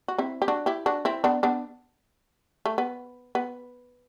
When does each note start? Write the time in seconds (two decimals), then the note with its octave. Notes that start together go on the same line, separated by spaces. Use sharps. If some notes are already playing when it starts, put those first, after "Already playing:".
0.08 F#4
0.18 C4 E4
0.42 G4
0.48 D4 F#4
0.66 E4 G4
0.86 D4 F#4
1.05 C4 E4
1.24 B3 D4
1.43 B3 D4
2.66 A3
2.78 B3
3.35 B3